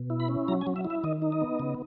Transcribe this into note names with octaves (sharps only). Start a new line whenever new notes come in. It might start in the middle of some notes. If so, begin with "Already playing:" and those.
Already playing: B2
E4
B5
C#4
F#3 A#5
G#5
F#3
E5
E4
E5
D#3 D#5
D#4
D#5
B3
C#3